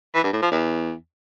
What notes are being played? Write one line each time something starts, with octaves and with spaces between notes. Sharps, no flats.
E3
G2
A2
F3
E2